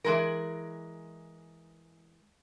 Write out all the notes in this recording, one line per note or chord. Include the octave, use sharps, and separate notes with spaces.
E3 G#3 A#4